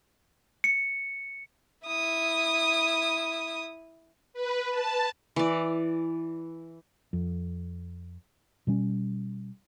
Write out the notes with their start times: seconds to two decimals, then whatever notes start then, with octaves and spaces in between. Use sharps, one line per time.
0.64 C#7
1.87 E4 D#6
4.33 B4
4.70 A5
5.36 E3 D5
7.13 F2
8.67 B2 G3 C#4